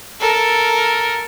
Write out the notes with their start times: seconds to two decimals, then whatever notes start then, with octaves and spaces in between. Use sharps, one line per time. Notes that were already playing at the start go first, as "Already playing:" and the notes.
0.20 A4 A#4